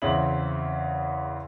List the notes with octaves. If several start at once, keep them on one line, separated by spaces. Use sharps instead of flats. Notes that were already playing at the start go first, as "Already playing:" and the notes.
E2 C#3 C4 E4 E5 F#7